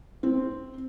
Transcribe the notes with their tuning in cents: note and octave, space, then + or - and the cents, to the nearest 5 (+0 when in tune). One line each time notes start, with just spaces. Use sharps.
C4 -5